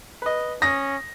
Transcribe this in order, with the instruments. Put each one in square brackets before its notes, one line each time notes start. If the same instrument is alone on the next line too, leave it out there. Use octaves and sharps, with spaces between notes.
[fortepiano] B4 D#5
[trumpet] C#4 [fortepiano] D#6 [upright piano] A#6